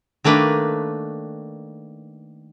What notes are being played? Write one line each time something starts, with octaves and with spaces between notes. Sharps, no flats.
D#3 A3 A#3 D4 B4